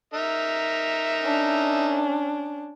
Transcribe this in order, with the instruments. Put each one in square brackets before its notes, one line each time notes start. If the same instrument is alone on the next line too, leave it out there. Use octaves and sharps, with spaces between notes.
[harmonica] D#4 A#4 E5
[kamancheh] C#4 D4